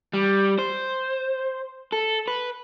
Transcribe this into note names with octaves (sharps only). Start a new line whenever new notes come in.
G3
C5
A4
B4